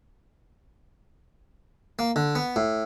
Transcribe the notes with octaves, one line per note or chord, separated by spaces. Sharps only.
A#3
D3
B3
A2